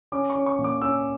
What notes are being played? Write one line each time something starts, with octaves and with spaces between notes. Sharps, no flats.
C#4 D6
C#6
C#4
C#6
A#2
D6
C#4 E6